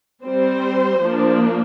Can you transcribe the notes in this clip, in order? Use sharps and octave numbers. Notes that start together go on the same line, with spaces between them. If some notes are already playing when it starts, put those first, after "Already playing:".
G3 C4 C5
F3 A#3 D4